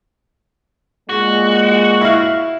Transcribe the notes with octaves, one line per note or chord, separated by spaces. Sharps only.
A#2 G#3 F#4
E4 F5